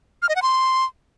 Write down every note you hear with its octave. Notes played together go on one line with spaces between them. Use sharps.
F6
D#5
F#5
C6